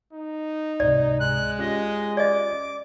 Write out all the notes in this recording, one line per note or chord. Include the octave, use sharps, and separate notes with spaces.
D#4
C#2 G#2 C3 D5
G#3 F#6
C#4 F4 G4 D#5
D5 D#5 D6